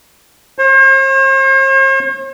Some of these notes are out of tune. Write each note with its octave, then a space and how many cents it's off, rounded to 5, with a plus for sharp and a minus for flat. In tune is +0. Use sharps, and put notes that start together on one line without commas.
C5 +45